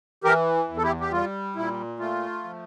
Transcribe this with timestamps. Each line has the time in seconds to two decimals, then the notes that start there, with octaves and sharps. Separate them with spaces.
0.24 E3 G4 A#4
0.68 E2
0.77 A4
0.83 E4 G4
1.01 G4
1.12 G3 F4
1.56 A#2 E4
1.99 A3 F4
2.44 F3